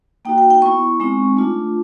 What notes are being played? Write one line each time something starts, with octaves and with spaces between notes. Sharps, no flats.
A#3 D#4 F#4 G5
G5
G5
B3 E4 C#6
G#3 C4 D#4
A3 D4 F4